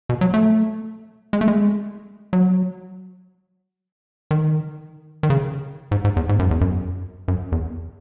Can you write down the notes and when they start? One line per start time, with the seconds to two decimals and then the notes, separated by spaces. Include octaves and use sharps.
0.09 B2
0.21 F#3
0.34 A3
1.33 G#3
1.41 A3
1.48 G#3
2.33 F#3
4.31 D#3
5.23 D#3
5.30 C#3
5.91 G#2
6.05 G#2
6.16 E2
6.29 G#2
6.39 F#2
6.51 E2
6.61 F#2
7.28 F#2
7.52 E2